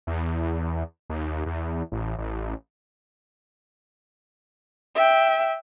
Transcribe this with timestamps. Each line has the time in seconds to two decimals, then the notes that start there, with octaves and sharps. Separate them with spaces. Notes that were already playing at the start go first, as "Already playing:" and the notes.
0.07 E2
1.10 D#2
1.46 E2
1.92 A1
2.18 A1
4.95 E5 G5